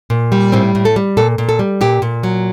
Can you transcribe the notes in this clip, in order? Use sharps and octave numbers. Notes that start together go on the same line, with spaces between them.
A#2
G3
A2 C4
A2
A4
G3
A#2 A4
A#2
A4
G3
A#2 G4
A#2
F#3